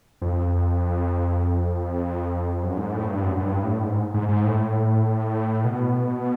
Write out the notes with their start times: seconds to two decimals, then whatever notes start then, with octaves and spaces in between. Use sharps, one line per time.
0.22 F2
2.63 F#2
2.77 G#2
2.93 A2
3.08 G2
3.23 F#2
3.37 F#2
3.43 G2
3.63 A2
3.83 G#2
4.14 G#2
4.29 G#2
4.44 A2
5.64 B2